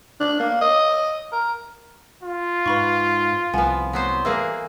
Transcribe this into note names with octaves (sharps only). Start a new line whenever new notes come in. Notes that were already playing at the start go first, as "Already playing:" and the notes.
D4
A#3
D#5
A#4
F4
G#2 B4 B5 C#6
C2 F3 B3 F#5 G#5
F#3 B3 C5
E3 A#3 G#4 A4 B4 E6